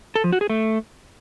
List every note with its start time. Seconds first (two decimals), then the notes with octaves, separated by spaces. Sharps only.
0.15 A4
0.24 F3
0.33 F#4
0.41 G#4
0.50 A3